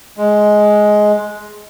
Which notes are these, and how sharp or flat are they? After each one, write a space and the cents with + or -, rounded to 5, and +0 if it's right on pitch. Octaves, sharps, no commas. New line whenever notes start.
G#3 +10